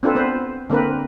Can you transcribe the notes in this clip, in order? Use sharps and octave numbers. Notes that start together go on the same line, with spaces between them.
C4 D4 F4 A4 B4
B3 B4 C5
D3 A#3 C4 A#4 B4